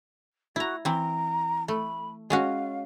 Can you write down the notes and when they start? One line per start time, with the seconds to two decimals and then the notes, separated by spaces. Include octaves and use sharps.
0.56 E4 F#4 A#5
0.85 E3 C4 A#5
1.68 A3 B5
2.30 G#3 C#4 F#4 F5